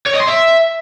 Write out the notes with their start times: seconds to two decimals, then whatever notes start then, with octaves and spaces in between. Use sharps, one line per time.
0.06 C#5
0.13 D#5
0.20 C6
0.27 E5